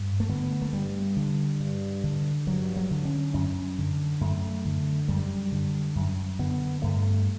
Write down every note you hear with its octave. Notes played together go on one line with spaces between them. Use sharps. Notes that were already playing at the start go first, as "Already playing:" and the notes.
Already playing: G2
A3
D3 B3
A3
G2 G3
D3
G2
D3
G2 F#3
F#3
D3
C#4
F#2 C#4
D3
F#2 A3
D3
F#2 G3
D3
F#2
D3 B3
G2 A3